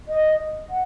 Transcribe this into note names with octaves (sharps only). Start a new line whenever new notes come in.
D#5
F#5